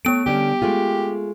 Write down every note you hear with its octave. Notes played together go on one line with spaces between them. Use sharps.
A3 B3 C#5 D7
D3 G3 C#4 G4
G#3 A3 F4